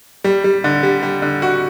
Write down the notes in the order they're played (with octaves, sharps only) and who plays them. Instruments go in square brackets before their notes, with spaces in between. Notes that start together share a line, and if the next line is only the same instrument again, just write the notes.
[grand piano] G3
G3
D3
G3
G3
D3
F#4